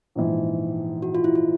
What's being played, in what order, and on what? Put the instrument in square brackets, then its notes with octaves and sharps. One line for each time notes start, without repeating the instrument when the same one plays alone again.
[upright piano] A#1 G#2 E3
[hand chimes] F#4
F4
E4
F4